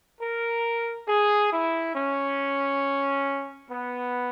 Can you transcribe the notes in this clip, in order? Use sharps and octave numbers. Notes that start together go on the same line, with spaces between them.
A#4
G#4
E4
C#4
B3